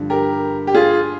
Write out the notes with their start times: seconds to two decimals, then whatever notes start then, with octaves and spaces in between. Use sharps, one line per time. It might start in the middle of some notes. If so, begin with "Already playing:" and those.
Already playing: G2 D3 F3
0.10 G4 A#4
0.67 G4
0.74 F4 G#4